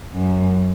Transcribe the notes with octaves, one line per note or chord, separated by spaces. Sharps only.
F#2